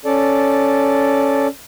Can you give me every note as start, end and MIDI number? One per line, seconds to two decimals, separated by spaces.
0.05 1.47 61
0.05 1.47 69
0.05 1.47 74